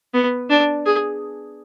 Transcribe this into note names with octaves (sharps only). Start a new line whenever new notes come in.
B3
D4
G#4